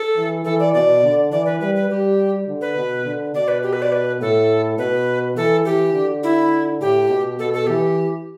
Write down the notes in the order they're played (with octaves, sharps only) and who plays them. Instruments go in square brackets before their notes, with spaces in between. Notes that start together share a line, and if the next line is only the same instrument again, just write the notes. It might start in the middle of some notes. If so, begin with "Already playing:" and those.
Already playing: [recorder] A4
[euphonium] E3
[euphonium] E3 [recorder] A4
[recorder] D5
[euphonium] B2 [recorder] D5
[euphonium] D3
[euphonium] E3 [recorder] D5
[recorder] B4
[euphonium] G3 [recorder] B4
[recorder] B4
[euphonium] G3 [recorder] G4
[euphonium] D3
[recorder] B4
[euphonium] B2
D3
[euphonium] B2 [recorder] D5
[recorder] B4
G4
B4
D5
B4
[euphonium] A2 [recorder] A4
[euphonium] B2 [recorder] B4
[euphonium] E3 [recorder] A4
[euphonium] E3 [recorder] G4
[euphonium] D3
[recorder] E4
[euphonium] A2 [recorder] G4
[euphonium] B2
[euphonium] B2 [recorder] A4
[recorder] A4
[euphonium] E3 [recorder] G4